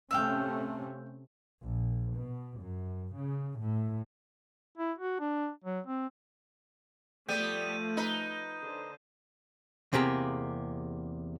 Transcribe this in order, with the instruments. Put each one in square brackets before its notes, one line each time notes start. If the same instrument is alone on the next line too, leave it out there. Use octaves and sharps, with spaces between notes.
[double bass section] C3 A3 C#4 [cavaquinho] E5 F5 G5
[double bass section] A#1
B2
F#2
C#3
A2
[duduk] E4
F#4
D4
F#3
C4
[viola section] F3 A3 [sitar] G3 B3 [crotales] G6 D#7
[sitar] D#4 B4
[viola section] D3 C5
[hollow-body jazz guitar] E2 C3 A#3 G4 G#4